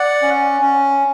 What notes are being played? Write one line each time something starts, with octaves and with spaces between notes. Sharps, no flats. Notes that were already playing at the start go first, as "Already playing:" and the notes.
Already playing: D5 F#5
C#4
C#4